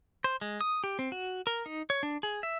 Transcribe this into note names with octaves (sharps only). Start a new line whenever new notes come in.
C5
G#3
D#6
G4
C4
F#4
A#4
D#4
C#5
D4
G#4
E5